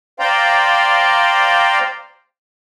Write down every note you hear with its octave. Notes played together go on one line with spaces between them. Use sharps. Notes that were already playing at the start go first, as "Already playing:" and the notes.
C5 D5 F5 G5 A#5 C6